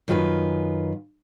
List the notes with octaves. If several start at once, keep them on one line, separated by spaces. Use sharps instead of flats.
F#2 D#3 F4 A4 B4